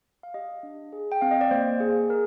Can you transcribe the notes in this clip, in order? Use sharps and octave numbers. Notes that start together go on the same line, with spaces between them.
F5
G4 D#5
D4
G#4
G5
C4 F5
D#5
D5
A#3 C5
G#4
G#4 A#4